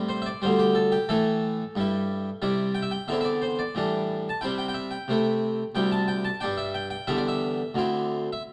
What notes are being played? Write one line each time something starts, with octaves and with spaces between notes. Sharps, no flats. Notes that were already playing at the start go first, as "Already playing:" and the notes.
Already playing: A2 G3 C4 E4
C5
E5
D5
D2 D3 G3 C5
G4
A4
G4
A2 E3 A3 E4 A4
G2 G3 E4
C3 G3 E4 D5
G5
E5
G5
E2 D3 C4 E4 E5
E5
D5
C5
D5
A2 E3 G3 D4
A5
C3 G3 C4 E4 G5
G5
G5
E5
G5
C3 A3 E4
D2 C3 G3 E4 G5
A5
G5
A5
G2 G3 D4 G5
E5
G5
G5
E2 D3 G3 D4 E5
D5
E5
D2 D3 C4 E4
E5